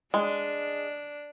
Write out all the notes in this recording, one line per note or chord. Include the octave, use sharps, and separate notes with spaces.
G#3 D4